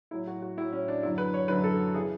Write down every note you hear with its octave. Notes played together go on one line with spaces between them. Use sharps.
A2 F#3 E4
F#4
F#4
A2 F#3 E4
C#4
D4
F#2 D3 F#3 E4
B4
C#5
F#2 D3 F#3 B4
A4
C#3 E3 G#4